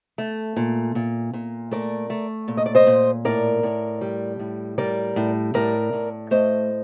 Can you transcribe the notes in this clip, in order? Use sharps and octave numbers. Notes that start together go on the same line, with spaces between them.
A3
A#2
A#2
A#2
A3 A#4 D5
A3
A#2
D#5
D5
C5 D#5
A#2
A2 A#4 D5
A2
G3
A2
G3 A#4 D5
A2
A2 A#4 D5
A2
A3 C5 D#5